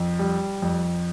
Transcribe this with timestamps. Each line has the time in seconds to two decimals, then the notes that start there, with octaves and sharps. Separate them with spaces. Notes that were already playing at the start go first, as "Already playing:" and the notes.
Already playing: F2
0.19 G3
0.62 F2